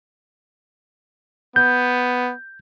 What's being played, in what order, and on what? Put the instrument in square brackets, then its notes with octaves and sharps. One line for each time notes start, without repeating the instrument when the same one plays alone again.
[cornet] B3 [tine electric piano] G6